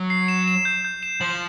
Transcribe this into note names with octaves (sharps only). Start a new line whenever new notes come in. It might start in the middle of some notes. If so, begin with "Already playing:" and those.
Already playing: F#3
C7
E7
E7
G6
G6
E7
F3 F#7